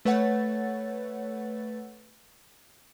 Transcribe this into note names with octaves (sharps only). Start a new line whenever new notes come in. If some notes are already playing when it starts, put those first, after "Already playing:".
A3 B4 C#5 F#5 A6